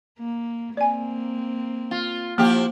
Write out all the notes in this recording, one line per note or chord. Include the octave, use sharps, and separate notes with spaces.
A#3
A#3 C4 D5 G#5
F4
F3 A#3 E4 G4